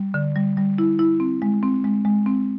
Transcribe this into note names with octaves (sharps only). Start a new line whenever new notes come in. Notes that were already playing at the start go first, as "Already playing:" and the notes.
Already playing: G3
D3
G3
G3
E4
E4
C4
G#3
C4
G#3
G#3
C4